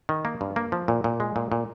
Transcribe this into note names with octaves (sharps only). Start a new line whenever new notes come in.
D#3
A#3
G2
A#3
F3
A#2
A#2
G#3
A#2
A#2